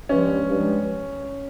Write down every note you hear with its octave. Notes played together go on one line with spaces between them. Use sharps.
G2 F3 G#3 C#4
G2 F3 G#3